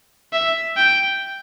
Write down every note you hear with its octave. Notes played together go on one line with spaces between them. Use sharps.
E5
G5